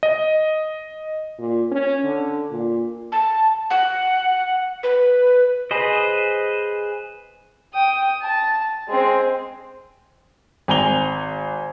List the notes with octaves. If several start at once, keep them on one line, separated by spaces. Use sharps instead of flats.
D#5
A#2
C#4
D3
A#2
A5
F#5
B4
G#4 B4 C5 D#5
G5 D#6
A5
G#3 C4
G#1 G#5 A#5 F7 G7